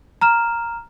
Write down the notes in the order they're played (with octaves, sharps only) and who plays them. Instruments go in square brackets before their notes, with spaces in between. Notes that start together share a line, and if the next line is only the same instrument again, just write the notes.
[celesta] A#5 F6 E7